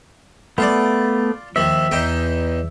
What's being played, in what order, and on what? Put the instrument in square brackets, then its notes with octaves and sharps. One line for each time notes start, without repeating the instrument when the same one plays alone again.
[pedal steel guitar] A3 B3 [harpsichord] F4 D5
[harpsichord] D#2 F3 [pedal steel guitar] E5
[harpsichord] E2 D#4 G5